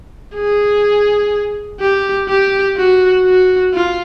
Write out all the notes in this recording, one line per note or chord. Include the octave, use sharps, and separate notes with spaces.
G#4
G4
G4
F#4
F#4
F4